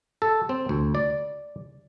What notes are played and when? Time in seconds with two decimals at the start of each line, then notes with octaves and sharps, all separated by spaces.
0.22 A4
0.49 C4
0.69 D2
0.95 D5